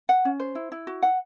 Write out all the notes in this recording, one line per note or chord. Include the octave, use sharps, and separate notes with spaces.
F#5
C#4
C5
E4
E4
F#4
F#5